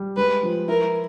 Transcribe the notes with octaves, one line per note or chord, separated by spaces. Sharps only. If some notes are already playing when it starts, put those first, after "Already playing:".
Already playing: G3
G#3 B4
F3
E4 A#4